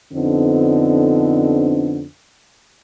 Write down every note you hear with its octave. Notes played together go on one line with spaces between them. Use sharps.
F2 D3 B3 C4 D4 D#4